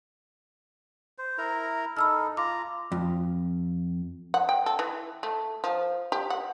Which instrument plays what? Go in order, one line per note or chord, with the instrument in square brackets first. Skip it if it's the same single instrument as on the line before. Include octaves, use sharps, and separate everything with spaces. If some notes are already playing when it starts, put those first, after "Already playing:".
[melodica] C5
E4 A#4 A#5
[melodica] D#4 A4 [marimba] B5 E6 F6
[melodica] F4 A#5 [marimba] D6
[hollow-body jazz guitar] F2
[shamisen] F#5
G5
A4
E3
A3
F3
G4
F#5